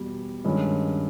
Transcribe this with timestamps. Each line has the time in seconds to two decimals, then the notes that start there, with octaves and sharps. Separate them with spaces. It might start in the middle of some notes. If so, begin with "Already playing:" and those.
Already playing: E2 B2 G3
0.45 G2 D#3 G#3 C#4